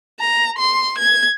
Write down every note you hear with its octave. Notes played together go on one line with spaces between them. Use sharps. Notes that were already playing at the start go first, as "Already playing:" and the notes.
A#5
C6
G#6